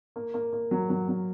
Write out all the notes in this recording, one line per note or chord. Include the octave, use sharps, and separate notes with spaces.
A#3
A#3
A#3
F#3
F#3
F#3